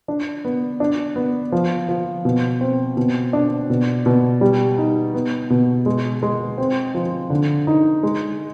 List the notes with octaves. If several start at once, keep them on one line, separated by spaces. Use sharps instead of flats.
D4
B3
D4
B3
F3
F3
B2
C4
B2
D4
B2
B2
G3
D#4
B3
B2
G#3
G#3
C4
F3
D3
D#4
G#3